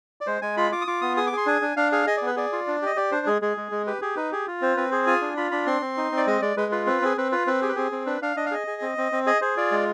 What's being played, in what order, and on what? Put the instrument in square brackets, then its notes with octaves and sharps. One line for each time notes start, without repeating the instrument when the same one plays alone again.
[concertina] D5
G#3 C5
G#3 G#5
F4 B5
F4 D6
D#6
F4 D6
B3 D#6
G#4 D#6
D6
G#4
C6
D4 G#5
D4
D4 F5
G#4 F5
G#4 D#5
D5
B3 B4
G#4 D5
F4
D4
G4 D#5
G4 D5
D4 C5
G#3 G#4
G#3 G#4
G#3
G#3
G4 B4
G4 G#4
D#4 B4
G4 G#4
F4
C4 C5
C4 B4
G#4 C5
F4 G#5
D4
F4 B5
D4 B5
C4 C6
C4
D#4
C4
D5
G#3 D#5
G#3 D5
G#3 B4
F4 B4
C4 B4
C4 G#4
C4 B4
F4 B4
C4 B4
G4 G#4
B4
C4 G#4
C4
D4 B4
D4 F5
D4 D#5
F5
G#4 D#5
G#4
C4
C4
C4
G#4 D#5
G#4 C5
F4 D5
G#3